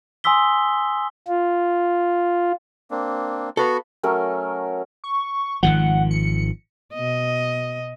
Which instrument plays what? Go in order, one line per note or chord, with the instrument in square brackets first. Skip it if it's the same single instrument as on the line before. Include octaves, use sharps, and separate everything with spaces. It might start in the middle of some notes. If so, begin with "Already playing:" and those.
[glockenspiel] G#5 C6 D#6 E6 B6 G7
[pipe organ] F4
[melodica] A#3 C4 D4
[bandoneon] B3 F#4 [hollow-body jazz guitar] A4 B4 F5
[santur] F#3 A3 C#4 A#4
[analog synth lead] C#6
[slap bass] G#1 D#3 F3 [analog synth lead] F#5
[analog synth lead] C#7
[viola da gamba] B2 D#5